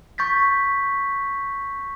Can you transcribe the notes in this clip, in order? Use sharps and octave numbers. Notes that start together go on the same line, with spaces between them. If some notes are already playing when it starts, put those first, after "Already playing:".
C#6 G6 A6 B6